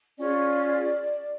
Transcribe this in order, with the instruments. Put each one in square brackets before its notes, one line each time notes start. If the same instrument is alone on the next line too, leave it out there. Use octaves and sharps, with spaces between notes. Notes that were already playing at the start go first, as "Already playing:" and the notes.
[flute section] C#4 F4 G#4 D5